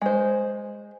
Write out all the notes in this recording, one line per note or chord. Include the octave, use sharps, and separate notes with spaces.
G#3 C5